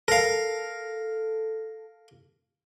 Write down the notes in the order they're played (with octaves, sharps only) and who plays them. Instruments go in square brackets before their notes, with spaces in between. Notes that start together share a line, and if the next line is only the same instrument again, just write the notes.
[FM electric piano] A4 [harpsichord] A#4 F5